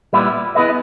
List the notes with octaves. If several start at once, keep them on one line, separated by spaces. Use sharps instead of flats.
A#2 G3 B3 E4
B3 E4 G#4 B4 D#5